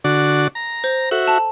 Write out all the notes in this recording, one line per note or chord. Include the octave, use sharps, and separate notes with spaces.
D3 F#4 D5
A#5
C5
F#4 A4 E5
A5